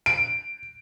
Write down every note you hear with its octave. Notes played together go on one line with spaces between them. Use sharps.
D7